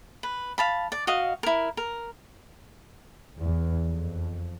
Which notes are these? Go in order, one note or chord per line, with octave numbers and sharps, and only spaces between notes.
B4
F5 A5 B5
D5
F#4 D#5 F5
E4 A#4
A#4
E2
F2